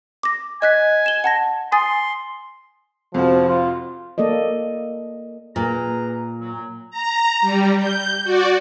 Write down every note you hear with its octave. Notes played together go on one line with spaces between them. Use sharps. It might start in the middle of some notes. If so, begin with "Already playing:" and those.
D6 A#6
D#5 G#5 F#6 B6
E7 G7
F#5 A5 A#6
G#5 C6 D#6 A6
F2 C3 F3 F#4
F4
A#3 A4 D5 D#5
A#2 G#4 B4 A#5
F#3
A#5
G3
G6
F#4 D5